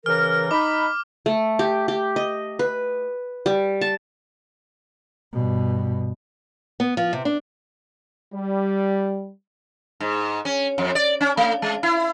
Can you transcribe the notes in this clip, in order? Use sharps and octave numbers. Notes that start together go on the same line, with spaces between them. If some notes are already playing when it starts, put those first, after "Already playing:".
C#3 E3 A#4 F6
D#4 B5 D6
A3
G4
G4
D#5
B4
G3
A5
G2 B2
B3
F3
C3
D4
G3
G#2
C#4
F2
D5
C#4
A3
G#3
E4